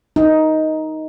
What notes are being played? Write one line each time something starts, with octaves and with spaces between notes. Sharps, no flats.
D#4